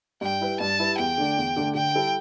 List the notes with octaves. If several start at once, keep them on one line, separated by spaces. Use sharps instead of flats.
G2 G5
G3 E4 B4
G2 A5
G3 E4 B4
E2 G5
D3 A3 D4
E2
D3 A3 D4
D3 G5
G3 E4 A4